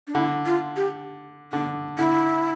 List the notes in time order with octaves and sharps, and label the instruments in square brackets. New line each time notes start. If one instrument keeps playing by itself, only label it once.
[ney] D4
[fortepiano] D3 [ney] E4
[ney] F4
G4
[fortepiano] D3 [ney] D4
[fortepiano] D3 [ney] E4